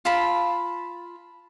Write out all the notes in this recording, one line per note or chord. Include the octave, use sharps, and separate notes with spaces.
F4 A5 B5